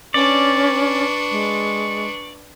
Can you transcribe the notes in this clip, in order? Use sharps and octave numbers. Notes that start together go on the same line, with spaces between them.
C#4 D4 B4 D5 C#6
G#3